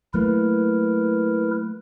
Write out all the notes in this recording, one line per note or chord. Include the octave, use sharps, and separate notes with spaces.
F#3 A3 A#3 E4 A#4 B4